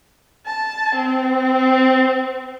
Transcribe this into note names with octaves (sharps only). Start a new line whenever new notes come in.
A5
C4